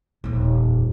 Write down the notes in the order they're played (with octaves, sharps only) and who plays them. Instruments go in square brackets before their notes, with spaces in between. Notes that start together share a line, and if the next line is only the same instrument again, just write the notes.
[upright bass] D#1 F2